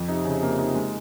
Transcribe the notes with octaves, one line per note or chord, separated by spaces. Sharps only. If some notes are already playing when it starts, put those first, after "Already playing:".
Already playing: F2
C3 D#4
C#3
A#3
D#4
G#3